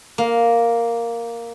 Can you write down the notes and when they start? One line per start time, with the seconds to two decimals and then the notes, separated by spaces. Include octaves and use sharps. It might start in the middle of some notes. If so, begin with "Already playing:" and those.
0.18 A#3